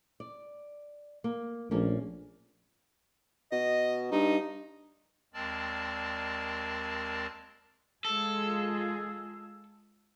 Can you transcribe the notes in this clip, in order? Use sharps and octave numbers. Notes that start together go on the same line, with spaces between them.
D5
A#3
A#1 A3 A#3 C#4
B2 D#5
G2 D#4
D#2 G#3 C4 A#4 D5 A5
G#3 F4 G#4 A4